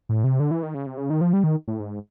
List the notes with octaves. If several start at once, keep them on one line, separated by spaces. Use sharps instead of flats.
A2
C3
D3
E3
D#3
C#3
C3
C#3
D#3
F3
G3
D#3
A2
G#2